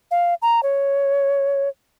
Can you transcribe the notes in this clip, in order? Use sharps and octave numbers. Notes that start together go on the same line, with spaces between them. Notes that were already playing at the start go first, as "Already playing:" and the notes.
F5
A#5
C#5